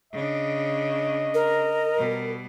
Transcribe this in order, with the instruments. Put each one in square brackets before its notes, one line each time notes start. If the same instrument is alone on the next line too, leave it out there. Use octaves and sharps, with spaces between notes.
[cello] C#3 D4 [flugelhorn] D#5
[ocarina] A#4
[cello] B2 G3